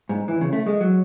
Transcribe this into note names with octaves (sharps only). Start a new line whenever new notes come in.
G#2
E3
C#3
A3
G#3
F#3